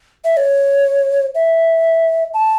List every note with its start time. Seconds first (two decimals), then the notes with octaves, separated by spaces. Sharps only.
0.25 E5
0.37 C#5
1.35 E5
2.34 A5